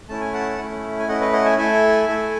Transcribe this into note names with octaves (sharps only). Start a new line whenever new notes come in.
A3 C#4 E4 A5
G#5
F#5 A5
A3 C#4 E4
G#5
A3 C#4 E4 D#5 F#5
B4 D#5
D#5 F#5
E5 G#5
A3 E4 A4 E5 G#5
A3 E4 A4